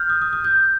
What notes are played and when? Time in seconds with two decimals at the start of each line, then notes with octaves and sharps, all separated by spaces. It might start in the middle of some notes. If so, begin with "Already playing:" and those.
Already playing: F6 G6
0.10 D#6
0.22 D#6
0.33 D#6
0.44 G6